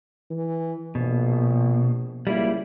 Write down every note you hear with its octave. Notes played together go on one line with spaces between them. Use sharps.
E3
A#1 B2
C#2 G3 A#3 E4